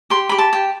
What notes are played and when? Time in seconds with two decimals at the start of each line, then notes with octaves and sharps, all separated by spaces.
0.10 G4 C6
0.29 G4 B5
0.38 A5
0.53 G4